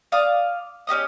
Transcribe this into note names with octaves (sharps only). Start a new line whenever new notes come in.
D5 F5 D6 D#6
C#4 G4 D#5 D#6